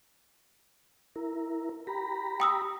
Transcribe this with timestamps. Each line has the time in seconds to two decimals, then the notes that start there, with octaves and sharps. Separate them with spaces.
1.16 E4 A#4
1.87 G4 A#5 B5
2.40 G5 D#6 E6